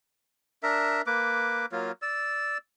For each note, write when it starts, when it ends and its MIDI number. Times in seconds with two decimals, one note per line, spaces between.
0.63 1.02 62
0.63 1.02 70
0.63 1.02 76
1.07 1.66 58
1.07 1.66 71
1.07 1.66 86
1.72 1.92 54
1.72 1.92 58
1.72 1.92 65
2.02 2.58 74
2.02 2.58 88